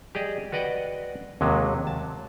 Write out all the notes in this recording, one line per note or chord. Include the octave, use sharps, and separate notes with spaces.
G4 G#4 D5 D#5
F#4 B4 D5 D#5 F#5 G5
D#2 C3 F#3 G#3
A5